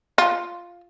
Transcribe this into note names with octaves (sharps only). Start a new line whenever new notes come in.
F4